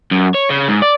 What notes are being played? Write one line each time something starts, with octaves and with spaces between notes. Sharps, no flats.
F#2
C#5
C#3
G#2
D5